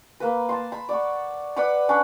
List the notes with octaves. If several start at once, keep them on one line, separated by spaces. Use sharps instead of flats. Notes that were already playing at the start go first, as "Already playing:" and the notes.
A#3 B4
A5 C6
B5
D5 F#5 C#6
B4 D5 F#5 B5
C#4 D4